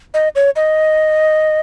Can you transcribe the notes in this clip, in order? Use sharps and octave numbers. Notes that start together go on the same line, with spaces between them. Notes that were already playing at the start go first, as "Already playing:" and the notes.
D#5
C#5
D#5